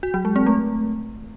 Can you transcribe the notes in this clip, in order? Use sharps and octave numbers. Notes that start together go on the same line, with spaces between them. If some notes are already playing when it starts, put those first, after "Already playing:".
F#4
F#3
G#3
C4
A3